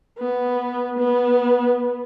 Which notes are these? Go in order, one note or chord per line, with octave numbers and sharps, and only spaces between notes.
B3
B3